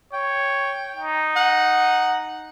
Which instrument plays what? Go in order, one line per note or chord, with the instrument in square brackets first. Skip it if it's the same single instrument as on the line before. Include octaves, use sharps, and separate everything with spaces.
[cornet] C#5 [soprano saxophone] G5
[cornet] D#4
[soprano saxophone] F#5